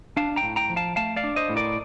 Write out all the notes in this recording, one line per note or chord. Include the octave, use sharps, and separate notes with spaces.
D4 F5 A5
G5 A#5
A2
G5 A#5
F3
F5 A5
A3 F5 A5
D5 F5
D4
C5 D#5
A2
A#4 D5